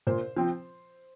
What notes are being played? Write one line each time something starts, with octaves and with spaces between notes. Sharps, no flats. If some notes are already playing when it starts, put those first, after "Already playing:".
A#2 C5
F3 C4